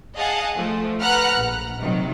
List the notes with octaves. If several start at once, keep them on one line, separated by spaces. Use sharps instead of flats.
G#4 D#5 F5 F#5 G#5 A5
F3 A3
B4 F#5 A#5 F6 F#6
A#1
C3 D#3 F#3